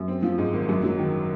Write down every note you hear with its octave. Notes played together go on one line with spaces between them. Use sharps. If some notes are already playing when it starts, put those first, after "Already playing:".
Already playing: F#2
C4
F3
G#2
G#1
F#2
F#3
D#3